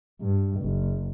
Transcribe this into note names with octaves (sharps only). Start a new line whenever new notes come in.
G2
F#1